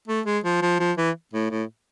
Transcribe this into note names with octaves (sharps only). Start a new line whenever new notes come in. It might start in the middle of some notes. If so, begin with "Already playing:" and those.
A3
G#3
F3
F3
F3
E3
A2
A2